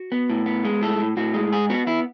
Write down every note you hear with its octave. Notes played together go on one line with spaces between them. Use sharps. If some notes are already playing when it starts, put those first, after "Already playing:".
Already playing: F#4
B3
A2
B3
G#3
A2 A4
A2
A2 F#4
G#3
G#2 G#4
B3 F#4
B3 E4